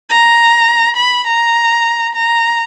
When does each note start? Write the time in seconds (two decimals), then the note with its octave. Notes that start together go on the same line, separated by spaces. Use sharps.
0.10 A#5
0.97 B5
1.27 A#5
2.15 A#5